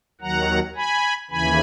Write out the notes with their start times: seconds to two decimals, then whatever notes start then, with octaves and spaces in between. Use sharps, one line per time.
0.21 D#2 D#3 F#3 F#5 A#5
0.75 G#5 B5
1.30 D#2 C#3 E3 G#5 B5